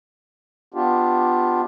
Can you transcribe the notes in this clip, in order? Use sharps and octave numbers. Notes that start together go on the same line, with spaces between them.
B3 D4 F4 G4